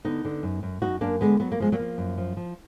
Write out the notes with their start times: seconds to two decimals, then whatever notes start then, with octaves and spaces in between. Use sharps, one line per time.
0.05 D3 B3 D#4
0.25 D3
0.43 F#2
0.63 F#2
0.82 F#2 D#4 F#4
1.01 F#2 A#3 D4
1.21 D3 G#3 B3
1.40 F#3 B3
1.52 A#3
1.60 F3 G#3
1.72 F#3 A#3
1.79 F3
1.98 F#2
2.18 F3
2.37 F3